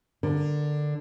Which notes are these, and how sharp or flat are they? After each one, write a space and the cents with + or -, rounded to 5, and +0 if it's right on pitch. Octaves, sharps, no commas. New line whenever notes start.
D3 +10 A#4 +0